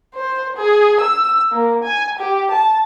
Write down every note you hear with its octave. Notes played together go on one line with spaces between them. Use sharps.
C5
G#4
E6
A#3
G#5
G4
A5